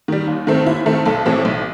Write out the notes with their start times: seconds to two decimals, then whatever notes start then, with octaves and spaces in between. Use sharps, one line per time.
0.08 D#3 G3
0.27 D#2
0.47 D#3 A3 C4
0.66 D#2 E4
0.86 D#3 A3 C4
1.06 B1 A4
1.25 A2 E3 A3 C4
1.45 B1